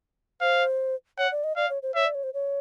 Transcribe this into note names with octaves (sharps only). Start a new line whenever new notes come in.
C5 F5
C#5 F#5
D5
D#5
D5 F5
C#5
C5
C#5 E5
D5
C#5
C5
C#5